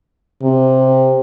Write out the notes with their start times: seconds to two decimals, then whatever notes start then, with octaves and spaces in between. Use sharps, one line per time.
0.43 C3